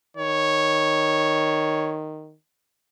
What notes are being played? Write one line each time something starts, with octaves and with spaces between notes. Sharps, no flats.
D#3 C#5